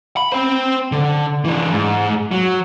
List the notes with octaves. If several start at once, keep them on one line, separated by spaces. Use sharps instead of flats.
B5
C5 G5
D3
E3 D4
G#2
F#3